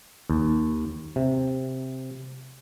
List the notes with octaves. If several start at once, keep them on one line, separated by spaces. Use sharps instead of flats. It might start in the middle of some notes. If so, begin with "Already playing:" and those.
D#2
C3